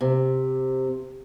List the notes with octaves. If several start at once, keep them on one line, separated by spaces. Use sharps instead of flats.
C3